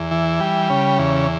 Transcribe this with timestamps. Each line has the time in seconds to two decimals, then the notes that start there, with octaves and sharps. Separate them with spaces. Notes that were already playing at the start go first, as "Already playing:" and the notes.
Already playing: E2
0.11 E3
0.40 G3
0.70 C#3
0.98 E2